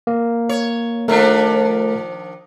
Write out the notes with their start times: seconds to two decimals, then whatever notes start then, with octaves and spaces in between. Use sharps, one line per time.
0.07 A#3
0.49 C#5
1.08 D#3 F3 A3 D4 A#4